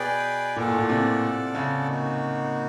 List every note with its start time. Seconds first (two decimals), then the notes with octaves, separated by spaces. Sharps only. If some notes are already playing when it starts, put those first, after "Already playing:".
Already playing: B2 G#4 B4 D5 G5
0.56 A#2 F4 A4 D5 F#5 A5
0.67 A2
0.78 A#2
0.89 C3
1.55 C#3
1.87 A#3 D#4 F#4